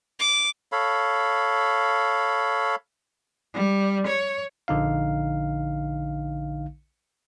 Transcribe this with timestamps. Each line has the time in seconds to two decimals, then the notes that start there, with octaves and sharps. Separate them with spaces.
0.19 D6
0.72 A4 C#5 F5 B5
3.54 G3
4.07 C#5
4.68 A#1 D3 D#4 F5